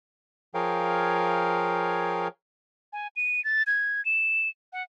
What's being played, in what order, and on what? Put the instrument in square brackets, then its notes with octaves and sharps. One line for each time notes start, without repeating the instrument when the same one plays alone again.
[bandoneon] F3 G#4 A#4 C#5 F5 G5
[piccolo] G#5
D#7
A6
G#6
E7
F#5